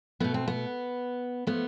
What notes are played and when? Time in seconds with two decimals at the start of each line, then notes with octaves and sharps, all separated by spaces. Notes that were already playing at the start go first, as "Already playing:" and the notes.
0.20 B2 A3 B3
0.34 C4
0.48 B3
1.47 F3 A3 B3